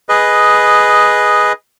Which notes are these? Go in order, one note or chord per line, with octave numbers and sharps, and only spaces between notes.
G#4 B4 D#5